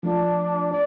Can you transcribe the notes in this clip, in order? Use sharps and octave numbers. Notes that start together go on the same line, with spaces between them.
F3 A3 D4 F4
D5